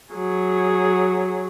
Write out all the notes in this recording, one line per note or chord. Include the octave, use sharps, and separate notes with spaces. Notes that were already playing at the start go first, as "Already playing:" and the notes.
F#3 G#4